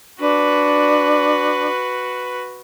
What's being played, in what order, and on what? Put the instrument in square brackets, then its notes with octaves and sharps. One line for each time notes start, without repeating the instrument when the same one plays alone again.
[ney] D4 [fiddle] F#4 B4